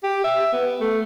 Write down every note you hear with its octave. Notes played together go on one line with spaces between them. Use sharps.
G4
E5
B3
A3